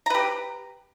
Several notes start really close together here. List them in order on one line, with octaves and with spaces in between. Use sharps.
A#5 B4 G4